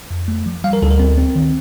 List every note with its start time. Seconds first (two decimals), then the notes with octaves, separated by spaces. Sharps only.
0.10 F2
0.28 A3
0.46 F3
0.64 G3 F5
0.73 A#4
0.82 D2 A4
0.91 A#4
1.00 C4
1.17 C4
1.35 D#3